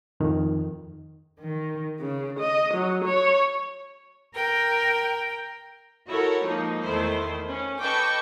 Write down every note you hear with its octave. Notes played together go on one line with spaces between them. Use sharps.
F2 D#3
D#3
C#3
D#5
F#3
C#5
A#4 G5
E4 F#4 A4 A#4 C#5
F3 G#3 A#3 D#4
E2 D#3 A3 E4 C5
C#4
A4 B4 D#5 G5 C#6 D6